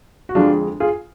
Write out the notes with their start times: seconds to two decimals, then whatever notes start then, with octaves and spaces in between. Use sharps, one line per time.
0.29 F#4
0.35 F2 D3 G#3 D4 F4
0.80 F4 G#4